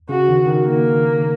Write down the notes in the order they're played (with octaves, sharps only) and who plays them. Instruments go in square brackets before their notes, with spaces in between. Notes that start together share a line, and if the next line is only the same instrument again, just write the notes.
[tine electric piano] C#3 [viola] F#4
[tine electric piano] D#3
D#3
[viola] A#3